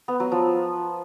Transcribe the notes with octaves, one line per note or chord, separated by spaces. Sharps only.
B3
F#3
F3